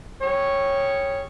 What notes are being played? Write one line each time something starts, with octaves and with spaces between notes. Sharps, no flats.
G3 G#4 C#5